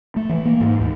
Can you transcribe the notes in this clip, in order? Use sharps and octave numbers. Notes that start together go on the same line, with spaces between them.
A3
E3
A#3
G#2
D#2